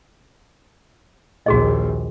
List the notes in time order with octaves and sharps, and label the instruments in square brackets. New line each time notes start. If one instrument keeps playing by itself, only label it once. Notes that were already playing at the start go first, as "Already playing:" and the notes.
[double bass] A#1 D#2 [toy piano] F#4 G#4 D#5